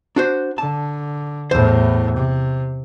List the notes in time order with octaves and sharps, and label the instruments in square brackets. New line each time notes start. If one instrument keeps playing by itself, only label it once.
[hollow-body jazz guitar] D4 F#4 C5
[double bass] D3 [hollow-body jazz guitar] A5
[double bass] E2 A2 [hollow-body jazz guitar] C5
[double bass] C3